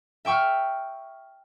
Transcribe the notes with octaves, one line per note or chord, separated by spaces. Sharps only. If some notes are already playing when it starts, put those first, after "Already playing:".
E5 G5 C#6 E6 F6